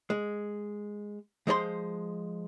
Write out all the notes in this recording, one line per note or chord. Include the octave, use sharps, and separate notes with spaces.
G#3
F3 G#3 C5 C#5 C6